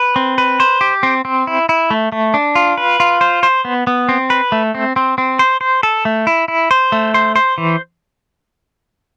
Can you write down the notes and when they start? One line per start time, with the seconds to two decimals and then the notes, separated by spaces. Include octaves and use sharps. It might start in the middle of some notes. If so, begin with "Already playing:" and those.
Already playing: B4
0.16 C4
0.38 B4
0.60 C5
0.81 G4
1.03 C4
1.25 C4
1.47 E4
1.69 E4
1.91 A3
2.12 A3
2.34 D4
2.55 F4
2.78 B4
3.00 F4
3.21 C5
3.43 C5
3.65 B3
3.87 B3
4.09 C4
4.30 B4
4.52 A3
4.75 C4
4.96 C4
5.18 C4
5.39 C5
5.61 C5
5.83 A4
6.05 A3
6.27 E4
6.48 E4
6.71 C5
6.92 A3
7.14 C5
7.36 C5
7.58 E3